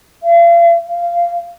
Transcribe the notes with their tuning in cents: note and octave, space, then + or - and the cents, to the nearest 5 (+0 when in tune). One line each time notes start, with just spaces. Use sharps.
F5 -40
F5 -15